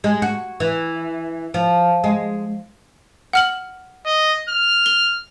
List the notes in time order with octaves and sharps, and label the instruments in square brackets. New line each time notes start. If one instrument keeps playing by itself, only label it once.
[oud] G#3
F#4
E3
F3
G#3
[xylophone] F#5 F6 F#7
[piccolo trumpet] D#5
F6
[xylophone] G7